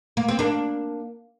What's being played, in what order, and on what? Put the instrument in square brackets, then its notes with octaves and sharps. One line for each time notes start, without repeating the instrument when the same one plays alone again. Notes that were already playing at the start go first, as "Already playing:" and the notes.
[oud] A#3
C4
A#3 D4